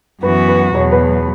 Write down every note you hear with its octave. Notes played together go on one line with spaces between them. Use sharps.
F#2 E3 B3 F#4 B4
B4
E2 B2 F#3 C#5
B4